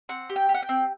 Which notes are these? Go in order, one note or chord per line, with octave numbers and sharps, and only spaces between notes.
C4 F#5
G4
G5
G4
F#5
G5
C4